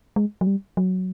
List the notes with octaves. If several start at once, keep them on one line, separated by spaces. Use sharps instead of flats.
G#3
F#3
G3
F#3